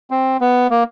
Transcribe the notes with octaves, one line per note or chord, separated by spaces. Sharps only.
C4
B3
A#3